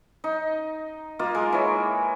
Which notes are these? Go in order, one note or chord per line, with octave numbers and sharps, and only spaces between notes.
D#4
A#3 D#4 F4
G#3 A#4
E3 C#5